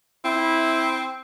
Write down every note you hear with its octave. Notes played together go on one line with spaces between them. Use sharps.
C4 E4